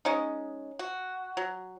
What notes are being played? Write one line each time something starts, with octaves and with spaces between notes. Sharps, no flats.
G#3 C#4 D#4
F#4
F#3